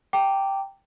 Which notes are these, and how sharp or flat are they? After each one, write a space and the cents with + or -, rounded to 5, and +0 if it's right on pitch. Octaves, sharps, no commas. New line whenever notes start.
G5 +0 A#5 -30 D6 -5